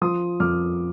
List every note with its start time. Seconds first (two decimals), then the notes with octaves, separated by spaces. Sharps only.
0.01 F3 C6 D#6
0.40 F2 D6 F6